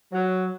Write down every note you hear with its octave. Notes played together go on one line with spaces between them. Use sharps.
F#3